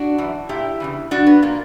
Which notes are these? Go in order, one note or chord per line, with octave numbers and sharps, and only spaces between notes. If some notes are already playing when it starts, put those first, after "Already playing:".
Already playing: D4 F#4
F#2 E3
A#2 E4 G4
E2 C#3 E3
E2 B2 D4 F#4
B3
A#2 A#3